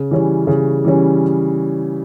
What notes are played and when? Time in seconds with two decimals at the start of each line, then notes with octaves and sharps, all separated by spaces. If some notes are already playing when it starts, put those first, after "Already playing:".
Already playing: C#3
0.11 E3 G3 C#4
0.47 C#3
0.85 E3 G3 C#4